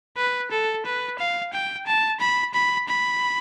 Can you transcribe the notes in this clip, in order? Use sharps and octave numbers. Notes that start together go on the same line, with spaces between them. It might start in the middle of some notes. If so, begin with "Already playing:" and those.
B4
A4
B4
F5
G5
A5
B5
B5
B5